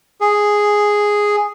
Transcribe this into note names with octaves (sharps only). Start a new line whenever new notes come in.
G#4